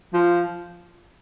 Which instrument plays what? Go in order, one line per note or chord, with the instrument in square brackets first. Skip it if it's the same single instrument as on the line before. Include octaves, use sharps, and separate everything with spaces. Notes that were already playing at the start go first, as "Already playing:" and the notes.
[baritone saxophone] F3